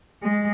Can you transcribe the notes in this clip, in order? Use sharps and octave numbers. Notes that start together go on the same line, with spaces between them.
G#3